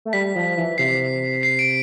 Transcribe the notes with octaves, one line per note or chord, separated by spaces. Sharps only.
A3
G3 B6
F3
E3
C3 C7
C7
D7